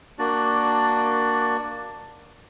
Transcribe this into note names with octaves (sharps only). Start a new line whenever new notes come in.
A#3 D4 F#4 D5